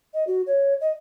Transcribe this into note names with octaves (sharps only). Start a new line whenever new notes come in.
D#5
F#4
C#5
D#5